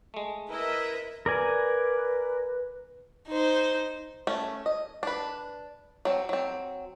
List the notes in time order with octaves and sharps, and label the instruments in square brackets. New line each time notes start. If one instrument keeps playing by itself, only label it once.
[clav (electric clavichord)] G#3 A3
[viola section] E4 D#5 [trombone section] A#4 [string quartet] B4 E5
[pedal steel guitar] A#4 D5 G#5 [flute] B4
[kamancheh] D#4 C5
[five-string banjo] A3 C#4
D#5
D4 B4
F#3 C4
F#3 C4